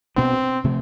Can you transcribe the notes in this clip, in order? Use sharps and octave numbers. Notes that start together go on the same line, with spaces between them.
B2 B3 C4 D4
C3 F3 A3